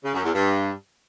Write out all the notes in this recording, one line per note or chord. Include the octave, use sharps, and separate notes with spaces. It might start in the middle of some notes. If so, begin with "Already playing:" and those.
C#3
F#2
E2
G2